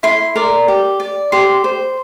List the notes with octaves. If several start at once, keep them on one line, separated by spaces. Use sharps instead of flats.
E4 C6
A#4 D5
G4
D5
G4 C6
C5